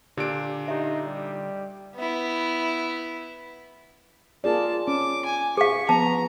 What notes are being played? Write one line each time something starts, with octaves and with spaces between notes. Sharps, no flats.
A#2 D3 D4 G4 D7
D#4 G4 E5
G3
B3 E4
A#3 F4 G#4 D5 A5
C#4 D6
G#5
G#4 F5 C#6
F3 B3 A5 A#5